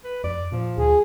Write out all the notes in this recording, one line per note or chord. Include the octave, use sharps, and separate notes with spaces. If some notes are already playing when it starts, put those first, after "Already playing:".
B4
F2 D5
A#2 F3
D2 G#4